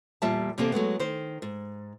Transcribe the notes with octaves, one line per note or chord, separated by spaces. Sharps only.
E2 A#2 G3 F4 E5 A5
E2 C3 A#3 C4 G4 A4
F#3 G#3 A3 B3
D#3 C5
G#2